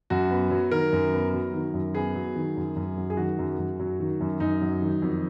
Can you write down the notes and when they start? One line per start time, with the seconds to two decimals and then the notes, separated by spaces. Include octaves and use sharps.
0.10 F#2 F#4
0.31 B3
0.51 F#3
0.71 D#3 A#4
0.93 F#2
1.13 B3
1.34 F#3
1.54 D#3
1.74 F#2
1.94 B3 G#4
2.15 F#3
2.36 D#3
2.57 F#2
2.76 F#2
2.97 F#3
3.10 G#4
3.17 D#3 F#4
3.39 F#2
3.58 F#2
3.80 F#3
4.00 D#3
4.21 F#2
4.40 F#2 D#4
4.62 F#3
4.82 D#3
5.02 F2